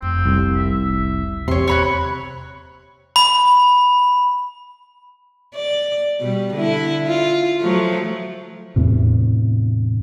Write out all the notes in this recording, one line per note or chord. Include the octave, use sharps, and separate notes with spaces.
F1 C4
C2
E5
F1
E2 C3 C#5 C6
E2 A#3 C#5 B5 F#6
B5
D5
B2 G3
D3 E4
F4
F3 F#3 A3
E2 A2 C3